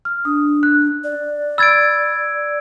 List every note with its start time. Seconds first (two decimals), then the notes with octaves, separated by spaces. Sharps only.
0.05 F6
0.25 D4 D#6
0.63 F#6
1.04 D5
1.58 B5 E6 G#6 A6 D7